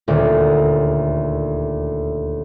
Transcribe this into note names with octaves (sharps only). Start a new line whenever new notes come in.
D#1 D2